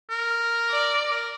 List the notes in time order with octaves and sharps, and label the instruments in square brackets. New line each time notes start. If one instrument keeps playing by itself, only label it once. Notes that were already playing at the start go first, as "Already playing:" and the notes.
[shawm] A#4
[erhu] D5
[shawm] A#4